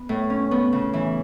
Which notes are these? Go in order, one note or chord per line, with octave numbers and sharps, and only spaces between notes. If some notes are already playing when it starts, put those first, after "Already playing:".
Already playing: B3 B4
A2
C#4
B3
C#3
E3